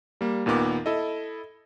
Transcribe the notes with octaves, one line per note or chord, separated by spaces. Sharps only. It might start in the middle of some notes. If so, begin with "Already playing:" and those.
G3 A#3
D#2 A#2 D#3 B3 D6
E4 A4 D#5